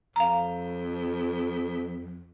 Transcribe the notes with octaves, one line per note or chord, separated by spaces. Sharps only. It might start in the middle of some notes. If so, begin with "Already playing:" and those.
F2 F5 A#5